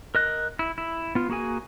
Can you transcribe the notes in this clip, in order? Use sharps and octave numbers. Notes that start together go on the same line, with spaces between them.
A#4 D#5 F#6
E4
E4
B3 F4
A#3 F#4 G#4 G#5